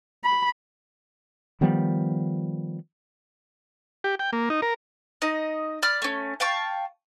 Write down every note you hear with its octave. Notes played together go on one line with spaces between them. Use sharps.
B5
D#3 F3 G3 B3
G4
G5
A#3
D#4
A#4
D#4 D#5
D5 B5 F6
A3 C#4
F5 G5 A5 C#6